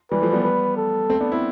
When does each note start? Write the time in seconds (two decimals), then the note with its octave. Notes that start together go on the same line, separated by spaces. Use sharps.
0.11 E3 G3 B4
0.22 F3 A3
0.33 G3 B3
0.44 B4
0.77 A4
1.10 A3 C4
1.20 B3 D4
1.32 C4 E4